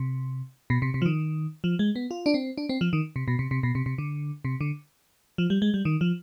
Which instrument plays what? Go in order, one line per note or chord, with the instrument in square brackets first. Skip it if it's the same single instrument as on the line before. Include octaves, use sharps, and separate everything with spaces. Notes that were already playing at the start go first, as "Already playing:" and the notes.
Already playing: [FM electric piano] C3
B2
C3
C3
F3
D#3
F3
G#3
B3
F4
D4
C4
D4
C4
F3
D#3
C3
B2
C3
C3
B2
C3
C3
D3
C3
D3
F3
G3
G#3
G3
D#3
F3